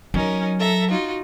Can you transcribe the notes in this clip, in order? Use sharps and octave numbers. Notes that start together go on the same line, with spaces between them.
F#3 C#4 D#4 A#4
A4 E5 A#5
D#4 F4 F#4